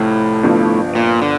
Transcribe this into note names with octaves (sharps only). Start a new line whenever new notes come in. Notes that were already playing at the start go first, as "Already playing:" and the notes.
Already playing: C2 A2 C3 F3 F4
G1 G2 F3
A#2
D3